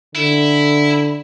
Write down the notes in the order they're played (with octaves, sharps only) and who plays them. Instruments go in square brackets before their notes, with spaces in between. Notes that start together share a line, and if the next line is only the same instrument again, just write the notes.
[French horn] D3 [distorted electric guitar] E4